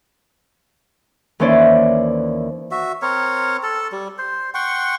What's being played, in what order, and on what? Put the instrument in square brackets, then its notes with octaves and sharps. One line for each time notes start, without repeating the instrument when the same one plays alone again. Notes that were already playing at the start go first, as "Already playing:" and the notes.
[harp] D#2 E3 C#4 C5 D5 E5
[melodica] F#4 E5
C4 A#4 C#5
A4 A5
G3
C5
F#5 G5 C6 C#6